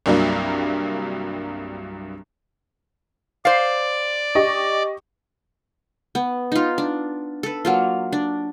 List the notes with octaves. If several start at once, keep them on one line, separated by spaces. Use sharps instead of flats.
C2 G2 F#3 G3 A#3
C5 D5 F5
G4 D#5 C#6
B3
D#4 F4
D4
A4 B4
F#3 A#3 F4
D4